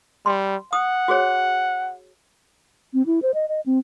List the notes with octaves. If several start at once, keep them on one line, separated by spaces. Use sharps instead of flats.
G3 C6
F#5 D#6
F#4 G#4 C#5
C4
E4
C5
D#5
D#5
C4